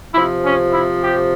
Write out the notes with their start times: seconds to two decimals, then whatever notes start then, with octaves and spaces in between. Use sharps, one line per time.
0.13 C3 F3 E4
0.43 C#4
0.71 E4
1.01 G4